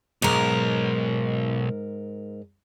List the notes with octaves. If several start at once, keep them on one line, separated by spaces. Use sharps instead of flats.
B1 G#2 A#4